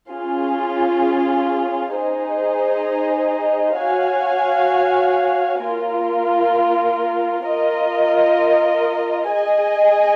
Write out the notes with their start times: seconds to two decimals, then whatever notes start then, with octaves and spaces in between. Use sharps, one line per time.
0.10 C#4 F4 G#4
1.94 D#4 G#4 C5 D#5
3.79 F#4 C#5 F5 G#5
5.64 A#3 F4 A#4
7.48 F4 A#4 D#5
9.32 G#4 D#5 G#5